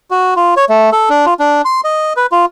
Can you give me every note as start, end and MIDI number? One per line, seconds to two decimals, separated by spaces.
0.11 0.34 66
0.36 0.54 65
0.57 0.65 73
0.69 0.90 57
0.92 1.09 69
1.09 1.26 62
1.26 1.34 65
1.39 1.62 62
1.65 1.81 84
1.84 2.13 75
2.16 2.26 71
2.32 2.45 65